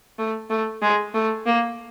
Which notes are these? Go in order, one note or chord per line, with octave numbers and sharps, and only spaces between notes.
A3
A3
G#3
A3
A#3